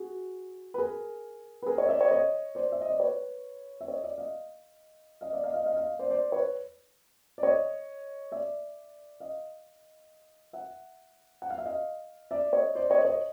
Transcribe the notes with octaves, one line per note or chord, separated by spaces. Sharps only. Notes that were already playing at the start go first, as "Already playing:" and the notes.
Already playing: F#4 G#4
B4
G#4 A#4
B4
G#4 A#4
C#5 D#5
D5 E5
C#5 D#5
C#5 D#5
C5 D5
E5
D#5
D5
B4 C#5
E5
C#5 D#5
D5 E5
D#5 F5
D#5 F5
D5 E5
D#5 F5
D#5 F5
D#5 F5
D#5 F5
C5 D5
C5 D5
B4 C#5
D5
C#5 D#5
D5 E5
D#5 F5
E5 F#5
F#5
F5
E5
D#5 F5
D5 E5
C#5 D#5
C5 D5
C#5 D#5
C#5 D#5